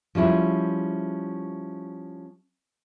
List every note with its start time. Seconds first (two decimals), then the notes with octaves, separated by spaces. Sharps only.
0.15 F3 G3 C#4 E4 G#4